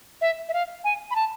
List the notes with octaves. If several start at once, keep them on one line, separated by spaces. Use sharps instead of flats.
E5
E5
F5
G#5
B5
A5